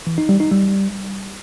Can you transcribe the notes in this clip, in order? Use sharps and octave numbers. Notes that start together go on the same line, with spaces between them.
E3
D#4
G3
D#4
G3